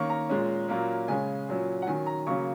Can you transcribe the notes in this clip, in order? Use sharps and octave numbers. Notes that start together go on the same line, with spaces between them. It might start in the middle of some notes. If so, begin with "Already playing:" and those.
Already playing: D#3 A#3 C#4 C#6
A#5
A#2 G#3 C#4
A#2 F#3 A#3 C#4
C#3 G#3 C#4 G#5
A#2 F#3 C#4
F#5
D#3 F#3 C#4 G#5
A#5
C#3 F#3 A#3 C#4 C#6